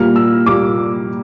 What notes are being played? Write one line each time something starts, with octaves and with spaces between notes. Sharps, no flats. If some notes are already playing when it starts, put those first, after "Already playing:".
Already playing: A#2 G3 A#3 F6
E6
A#2 G3 A#3 D6